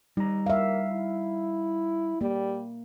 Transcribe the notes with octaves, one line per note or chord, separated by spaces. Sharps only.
G3 D#4 A#5
A#3 E5 F5
E4
G3 A#3